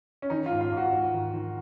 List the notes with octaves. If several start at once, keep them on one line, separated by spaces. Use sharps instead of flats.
C#4
D#3 D#4
F4
G#2
F4
G#2
F#4
G#2
D#3
D#3